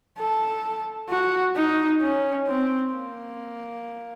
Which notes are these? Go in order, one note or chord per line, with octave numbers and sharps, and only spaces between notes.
A4
F#4
D#4
C#4
C4
A#3